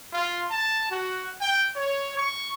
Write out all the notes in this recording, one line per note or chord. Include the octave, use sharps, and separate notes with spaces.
F4
A5
F#4
G5
C#5
C#6